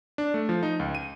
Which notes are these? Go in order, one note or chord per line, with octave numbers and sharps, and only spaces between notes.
D4
A3
F3
D#4
C#2
D#7